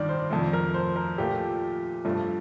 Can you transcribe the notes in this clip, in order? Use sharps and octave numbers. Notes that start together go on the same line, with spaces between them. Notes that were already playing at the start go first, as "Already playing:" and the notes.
Already playing: G2 D#3 D5
C5
F2 D#3 A3 A4
A#4
C5
A#4
A#2 F3 A3 G4
G2 F3 A3